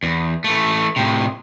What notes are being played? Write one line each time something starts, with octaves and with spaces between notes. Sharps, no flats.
E2
E3 A3
A2 C3